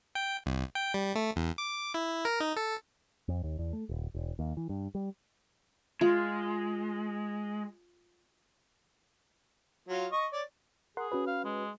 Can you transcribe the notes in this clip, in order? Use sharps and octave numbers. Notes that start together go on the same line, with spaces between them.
G5
C2
G5
G3
A3
E2
D6
E4
A#4
D#4
A4
F2
D#2
E2
A3
D#1
E1
D#2
E3
G2
G3
G#3 F4
F#3 F4
D#5 C#6
C#5 D5
G#4 A#4 F#5 C6
C#4 F#4 B4
F5
G#3